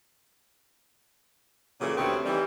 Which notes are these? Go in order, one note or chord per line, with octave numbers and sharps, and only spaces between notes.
A#2 C#3 E3 F#3 A3
D2 C3 B3 C4 C#5
D#3 E3 G3